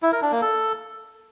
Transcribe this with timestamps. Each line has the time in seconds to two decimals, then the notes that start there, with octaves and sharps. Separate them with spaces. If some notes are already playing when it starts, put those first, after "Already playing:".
0.03 E4
0.12 A#4
0.22 D4
0.32 A#3
0.42 A4